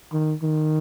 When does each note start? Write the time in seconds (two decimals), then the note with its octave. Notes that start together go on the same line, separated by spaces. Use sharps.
0.12 D#3
0.42 D#3